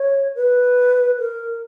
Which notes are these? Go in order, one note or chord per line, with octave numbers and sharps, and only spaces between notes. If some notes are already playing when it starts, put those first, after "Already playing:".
Already playing: C#5
B4
A#4